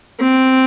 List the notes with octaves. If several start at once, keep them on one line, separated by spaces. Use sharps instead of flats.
C4